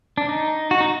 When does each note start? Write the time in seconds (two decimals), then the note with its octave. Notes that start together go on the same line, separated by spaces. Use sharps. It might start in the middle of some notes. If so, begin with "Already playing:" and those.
0.18 D4
0.29 D#4
0.71 F#4
0.81 D#4